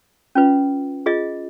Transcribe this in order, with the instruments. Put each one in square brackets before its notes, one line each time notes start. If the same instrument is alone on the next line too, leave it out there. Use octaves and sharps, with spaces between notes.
[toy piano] C#4 F4 B4
F4 G#4 D#5